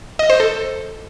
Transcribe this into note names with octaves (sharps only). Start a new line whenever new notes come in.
D#5
C5
A4